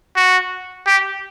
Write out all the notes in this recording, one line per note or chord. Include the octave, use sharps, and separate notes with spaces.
F#4
G4